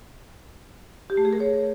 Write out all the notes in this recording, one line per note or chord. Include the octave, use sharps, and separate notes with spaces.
G4
A3
G#4
A#4
C#5